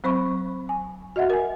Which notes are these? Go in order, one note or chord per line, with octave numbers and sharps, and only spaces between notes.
F#3 C4 C5 B5 C#6
G#5
F#4 D#5 E5 F#5
A#4 G#5